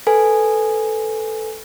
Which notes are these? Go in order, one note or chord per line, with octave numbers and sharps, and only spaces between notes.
A4 B4 G#5